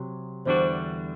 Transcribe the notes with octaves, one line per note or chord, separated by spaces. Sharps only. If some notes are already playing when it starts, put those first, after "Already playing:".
Already playing: C3 F#3
E2 D3 G3 D4 F#4 C5